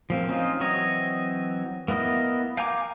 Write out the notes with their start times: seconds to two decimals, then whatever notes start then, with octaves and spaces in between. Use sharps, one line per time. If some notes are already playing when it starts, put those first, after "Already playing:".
0.10 F3 A#3 C4
0.29 C4 C#4 D#4 F4
0.60 E3 F#3 C4 C#5 D#5
1.88 A#3 B3 E4 D#5
2.57 F5 G5 G#5 A#5 D6